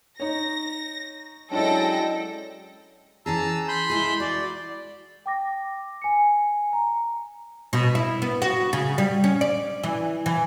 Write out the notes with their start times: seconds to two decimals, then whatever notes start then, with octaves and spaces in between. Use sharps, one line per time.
0.20 D#4 C#5 A#6
1.51 F#3 G#3 C#4 D4 E4 A4 G5 A#6
3.26 E3 C#4 G#4 A5 A#5 E6
3.68 B5 C6 G6
3.90 G#3 E4 G#4
4.20 F#4 D5
5.26 G5 D6 A#6
6.02 G#5 C#7
6.73 A#5
7.73 B2
7.95 E4
8.22 B3
8.42 F#4
8.73 C#3
8.98 G3
9.24 C#4
9.41 D5
9.84 E3
10.26 E3